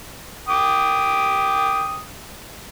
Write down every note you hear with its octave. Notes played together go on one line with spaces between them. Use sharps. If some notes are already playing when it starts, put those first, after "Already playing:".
G5 D6 D#6